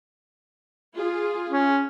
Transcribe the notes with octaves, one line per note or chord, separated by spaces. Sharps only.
F4 G#4
C#4